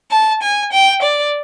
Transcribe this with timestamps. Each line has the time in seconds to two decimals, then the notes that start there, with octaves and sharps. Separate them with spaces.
0.11 A5
0.42 G#5
0.72 G5
1.02 D5